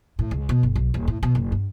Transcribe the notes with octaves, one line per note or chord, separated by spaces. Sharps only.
A2
C#2
B2
G1
B1
D#1
A2
B2
F#1
G2